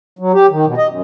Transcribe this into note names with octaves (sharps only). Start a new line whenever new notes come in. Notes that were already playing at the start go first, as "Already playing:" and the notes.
F#3
G4
D#3
B2
D#5
F#2